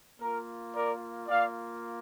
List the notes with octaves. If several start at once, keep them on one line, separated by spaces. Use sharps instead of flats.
A#3 F4 A#4
A#4 D5
A#3 F4 D5 F5